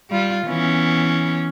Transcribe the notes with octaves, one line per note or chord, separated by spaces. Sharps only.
G3 F4
E3 B3 C#4